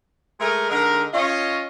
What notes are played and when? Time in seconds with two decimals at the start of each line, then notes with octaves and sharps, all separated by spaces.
0.40 G#3 A3 G#4 A#4
0.69 D3 G#3 D#4 A#4
1.13 C#4 F4 C#5 D#5